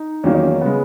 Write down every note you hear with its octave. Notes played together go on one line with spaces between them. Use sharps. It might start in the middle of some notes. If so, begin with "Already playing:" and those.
Already playing: D#4
E2 D#3 F#3 A#3 C#4
D#4
C#4
C#3 G#3 B3